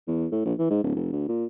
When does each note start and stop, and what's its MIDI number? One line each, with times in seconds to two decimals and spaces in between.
0.08 0.26 40
0.32 0.44 45
0.45 0.54 34
0.59 0.70 52
0.70 0.80 44
0.83 0.93 26
0.96 1.09 29
1.12 1.26 38
1.28 1.45 46